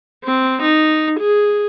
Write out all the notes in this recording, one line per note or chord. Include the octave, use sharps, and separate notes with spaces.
C4
D#4
G#4